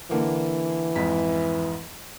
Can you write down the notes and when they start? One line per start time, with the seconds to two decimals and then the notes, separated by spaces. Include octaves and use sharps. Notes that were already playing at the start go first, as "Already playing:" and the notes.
0.11 D3 E3 A#3
0.95 F2 G#2 B6